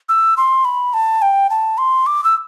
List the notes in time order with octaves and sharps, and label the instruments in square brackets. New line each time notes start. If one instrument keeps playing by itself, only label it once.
[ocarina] E6
C6
B5
A5
G5
A5
C6
D6
E6